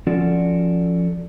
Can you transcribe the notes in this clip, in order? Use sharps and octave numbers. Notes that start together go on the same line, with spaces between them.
F3 C#4 F4 F#4 A4 D5